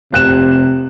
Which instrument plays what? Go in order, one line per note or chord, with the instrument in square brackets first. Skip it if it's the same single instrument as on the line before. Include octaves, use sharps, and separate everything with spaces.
[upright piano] F1 F#6 E7 [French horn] C3